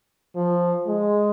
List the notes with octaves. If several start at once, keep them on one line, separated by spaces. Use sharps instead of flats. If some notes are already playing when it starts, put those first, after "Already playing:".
F3
G#3